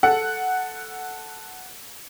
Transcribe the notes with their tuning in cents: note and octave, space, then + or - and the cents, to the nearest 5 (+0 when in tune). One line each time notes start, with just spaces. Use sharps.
A4 +0 F#5 +0